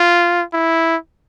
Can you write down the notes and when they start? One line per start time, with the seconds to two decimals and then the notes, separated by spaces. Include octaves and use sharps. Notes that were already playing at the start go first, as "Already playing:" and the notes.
Already playing: F4
0.54 E4